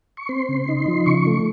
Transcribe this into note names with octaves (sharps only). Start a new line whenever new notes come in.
C#6
C4 C6
C#3
D#4
F3
C#3 C#6
A3